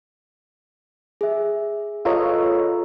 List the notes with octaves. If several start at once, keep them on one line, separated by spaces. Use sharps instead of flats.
G#4 E5
F4 A4 B4 C#5 D#5 A#5